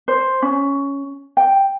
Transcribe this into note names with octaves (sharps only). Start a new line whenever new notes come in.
C5
C#4
G5